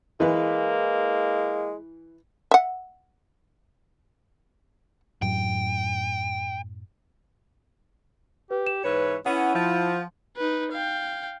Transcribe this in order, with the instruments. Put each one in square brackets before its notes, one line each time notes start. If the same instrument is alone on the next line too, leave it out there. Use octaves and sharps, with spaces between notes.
[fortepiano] E3 B4 [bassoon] G#3 [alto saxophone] A#3
[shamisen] E5 F#5
[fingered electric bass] F#2 A2 F#3 [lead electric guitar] G5
[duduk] G4 [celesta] B4
[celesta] E7
[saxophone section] G#2 E3 C#5 [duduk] B4
[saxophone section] B3 C#4 [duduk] E4 [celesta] F#5
[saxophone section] F3
[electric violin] D#4 B4
F5 G5